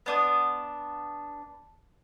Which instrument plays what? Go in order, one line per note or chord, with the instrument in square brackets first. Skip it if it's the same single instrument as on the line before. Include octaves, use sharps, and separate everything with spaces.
[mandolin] B3 D4 D#6